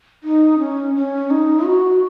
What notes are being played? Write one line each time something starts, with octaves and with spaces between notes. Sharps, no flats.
D#4
C#4
C#4
D#4
F#4